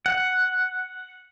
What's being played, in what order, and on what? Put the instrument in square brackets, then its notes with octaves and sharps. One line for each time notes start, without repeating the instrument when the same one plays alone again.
[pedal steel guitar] F#5